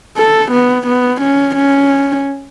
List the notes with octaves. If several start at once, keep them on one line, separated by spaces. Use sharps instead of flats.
A4
B3
B3
C#4
C#4